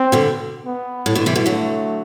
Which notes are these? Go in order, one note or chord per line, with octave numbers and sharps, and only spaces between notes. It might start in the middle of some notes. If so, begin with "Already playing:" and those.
Already playing: C4
B2 D3
B3
A2
B2 D3
C3 E3
B2 D3
D3 F#3 A3